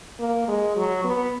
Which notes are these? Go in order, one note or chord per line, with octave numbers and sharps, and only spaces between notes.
A#3
G#3
F#3
B3